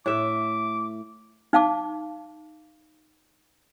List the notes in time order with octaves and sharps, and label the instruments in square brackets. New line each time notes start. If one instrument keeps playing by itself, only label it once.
[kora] A2 E5 [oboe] D6
[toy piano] D#4 F5 A5 D6